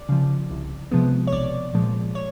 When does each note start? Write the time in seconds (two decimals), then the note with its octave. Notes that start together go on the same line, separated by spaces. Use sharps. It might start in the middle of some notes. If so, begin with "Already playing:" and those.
Already playing: D5
0.09 C#3 F3
0.50 C2
0.91 C3 F3 G#3 B3
1.27 C#5
1.32 B1 D5
1.73 A#2 F3 G#3
2.15 C#5